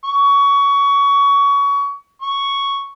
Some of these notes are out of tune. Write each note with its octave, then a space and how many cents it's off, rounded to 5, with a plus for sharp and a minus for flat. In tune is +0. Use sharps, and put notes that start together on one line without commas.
C#6 +25
C#6 +0